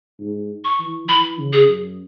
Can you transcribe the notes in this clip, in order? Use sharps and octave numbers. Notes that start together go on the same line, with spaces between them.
G#2
C#6
E3
E3 B5
C#3
G#4
F#2